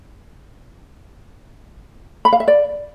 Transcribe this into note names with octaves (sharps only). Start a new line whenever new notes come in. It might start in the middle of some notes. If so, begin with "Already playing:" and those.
B5
F5
E5
D5